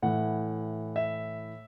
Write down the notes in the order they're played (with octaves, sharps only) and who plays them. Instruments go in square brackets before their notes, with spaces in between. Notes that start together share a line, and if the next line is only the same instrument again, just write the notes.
[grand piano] A2 E3 F#5
E5